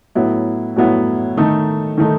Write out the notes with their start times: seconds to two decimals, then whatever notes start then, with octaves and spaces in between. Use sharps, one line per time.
0.15 A2 F#3 B3 E4
0.76 A2 F#3 B3 E4
1.37 D#3 A3 D#4 A4
1.98 D#3 A3 D#4 A4